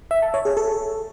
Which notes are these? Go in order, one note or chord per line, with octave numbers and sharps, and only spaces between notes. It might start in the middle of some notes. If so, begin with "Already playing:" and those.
E5
A5
C#5
G#4
A4